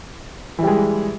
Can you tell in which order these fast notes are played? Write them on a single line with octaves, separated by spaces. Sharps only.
E3 G3 G#3